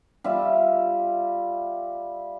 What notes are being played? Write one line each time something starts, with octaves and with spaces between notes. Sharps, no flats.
G3 F4 E5